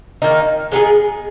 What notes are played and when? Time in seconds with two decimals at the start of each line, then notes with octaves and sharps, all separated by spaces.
0.22 D#3 A#3 D#4
0.72 G#3 B3 D#4 G#4